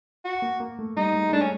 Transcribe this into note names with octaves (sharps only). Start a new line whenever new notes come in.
F#4
A#3
A#3
A3
G3 D#4
G#3
G#3
A3 D4
C#4